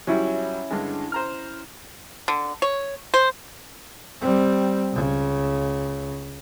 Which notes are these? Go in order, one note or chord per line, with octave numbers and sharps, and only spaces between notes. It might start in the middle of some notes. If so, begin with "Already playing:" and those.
F#3 G3 C#4 E4
G2 D3 G#3
C5 A#5 F6
D3
C#5
C5
G3 C4
C#2 C#3